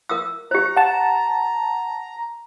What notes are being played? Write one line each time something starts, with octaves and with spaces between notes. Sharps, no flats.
A#4 D#6 E6
G4 C5 A#5
F#5 A5